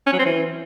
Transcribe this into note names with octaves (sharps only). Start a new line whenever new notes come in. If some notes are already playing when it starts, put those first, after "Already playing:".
C#4
F#3
C4
E3